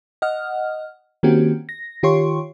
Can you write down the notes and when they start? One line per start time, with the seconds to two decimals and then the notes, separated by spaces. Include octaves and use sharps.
0.22 D#5 F#5 F6
1.23 D#3 A#3 C4 C#4 F#4 G4
1.69 A#6
2.03 D#3 F4 G4 C#5 C6 C#6